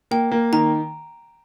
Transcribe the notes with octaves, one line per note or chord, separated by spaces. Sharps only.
A#3 G5
A#3
D#3 A#5